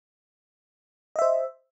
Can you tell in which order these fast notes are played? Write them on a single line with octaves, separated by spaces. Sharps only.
D#5 E5 C5